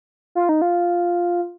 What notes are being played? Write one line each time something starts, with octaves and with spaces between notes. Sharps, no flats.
F4
D#4
F4